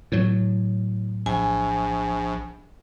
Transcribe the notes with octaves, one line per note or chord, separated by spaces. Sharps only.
A2 F#3
A#1 G#5